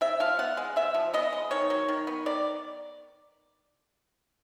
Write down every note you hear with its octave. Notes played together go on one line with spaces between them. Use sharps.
C3 E5
F3 F5
B3 F#5
G#3
C3 E5
F3
B3 D#5
G#3
D#3 C#5
F#3
D#3
B3
D#3 D5